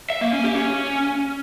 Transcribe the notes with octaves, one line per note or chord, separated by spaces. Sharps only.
E5
A#3
C#4
G4
C#4